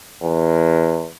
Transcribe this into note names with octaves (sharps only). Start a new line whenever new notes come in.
E2